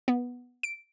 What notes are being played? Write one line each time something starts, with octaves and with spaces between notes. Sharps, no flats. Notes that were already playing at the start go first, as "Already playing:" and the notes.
B3
D7